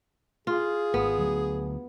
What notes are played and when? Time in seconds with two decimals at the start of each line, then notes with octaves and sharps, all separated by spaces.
0.47 F4 G#4
0.94 G#1 B3
1.18 D2 F#3